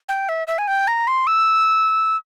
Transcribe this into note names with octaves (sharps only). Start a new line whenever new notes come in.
G5
E5
E5
G#5
G5
A#5
C6
E6